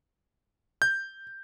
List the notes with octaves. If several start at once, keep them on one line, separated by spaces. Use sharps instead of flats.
G6